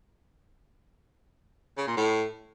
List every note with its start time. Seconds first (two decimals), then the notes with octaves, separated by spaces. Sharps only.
1.77 C#3
1.87 A#2
1.97 A2